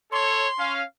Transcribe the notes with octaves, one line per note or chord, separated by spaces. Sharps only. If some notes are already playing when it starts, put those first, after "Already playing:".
A4 C#5 C6
C#4 F5